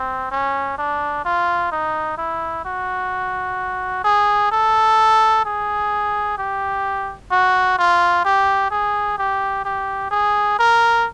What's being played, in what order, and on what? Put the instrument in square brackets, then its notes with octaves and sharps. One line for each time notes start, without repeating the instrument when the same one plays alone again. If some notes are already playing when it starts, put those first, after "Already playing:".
Already playing: [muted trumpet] C4
C#4
D4
F4
D#4
E4
F#4
G#4
A4
G#4
G4
F#4
F4
G4
G#4
G4
G4
G#4
A#4